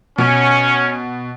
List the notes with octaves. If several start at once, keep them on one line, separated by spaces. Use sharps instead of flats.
B2 C#4